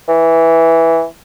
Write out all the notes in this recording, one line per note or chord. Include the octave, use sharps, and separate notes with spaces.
E3